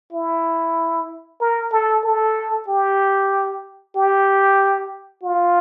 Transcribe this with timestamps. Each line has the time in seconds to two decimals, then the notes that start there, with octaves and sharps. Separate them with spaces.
0.13 E4
1.40 A#4
1.72 A4
2.05 A4
2.68 G4
3.96 G4
5.23 F4